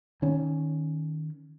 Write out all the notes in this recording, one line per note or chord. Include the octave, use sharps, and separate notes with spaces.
D#3 C#4